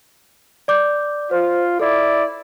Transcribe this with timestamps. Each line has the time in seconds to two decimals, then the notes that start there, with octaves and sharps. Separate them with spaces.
0.68 D5 D6 G6
1.31 F4 C5
1.80 E4 A4 D5